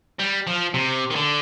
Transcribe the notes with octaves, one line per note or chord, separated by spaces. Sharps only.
G3
F3
C3
D#3
D3